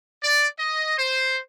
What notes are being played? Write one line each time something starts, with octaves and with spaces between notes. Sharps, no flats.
D5
D#5
C5